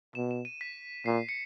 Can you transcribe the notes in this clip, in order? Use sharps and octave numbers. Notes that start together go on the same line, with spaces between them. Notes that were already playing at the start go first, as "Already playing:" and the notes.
B2 E7
E7
D#7
B6
A#2 C7
C#7